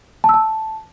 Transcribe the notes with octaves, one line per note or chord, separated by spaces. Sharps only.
A5
E6
A5